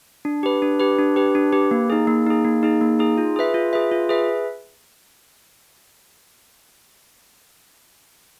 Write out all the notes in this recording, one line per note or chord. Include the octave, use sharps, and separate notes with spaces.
D4
G4 B4
D4
G4 B4
D4
G4 B4
D4
G4 B4
A#3
D#4 G#4
A#3
D#4 G#4
A#3
D#4 G#4
A#3
D#4 G#4
F4
G#4 B4 E5
F4
G#4 B4 E5
F4
G#4 B4 E5